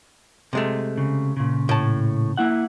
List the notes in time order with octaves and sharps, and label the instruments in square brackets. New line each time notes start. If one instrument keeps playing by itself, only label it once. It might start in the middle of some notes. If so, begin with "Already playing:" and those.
[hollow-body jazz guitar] C3 G#3 A3
[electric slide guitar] C#3
A#2 C#3
[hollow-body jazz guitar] A2 A5
[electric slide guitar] A#3 E4 F#5